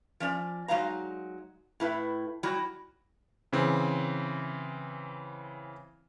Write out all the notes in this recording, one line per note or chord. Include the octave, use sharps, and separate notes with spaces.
F3 C#4 D5
F#3 G#3 D#4 F5 A#5
A2 E4 B4
F#3 G3 E4 F#4
C#3 E3 C4